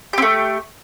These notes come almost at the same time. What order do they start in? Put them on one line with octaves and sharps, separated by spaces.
G4 C4 A3